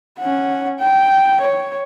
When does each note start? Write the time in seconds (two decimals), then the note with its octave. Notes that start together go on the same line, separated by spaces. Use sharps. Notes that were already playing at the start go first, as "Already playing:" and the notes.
0.19 C#4 F#5
0.79 G5
1.41 C#5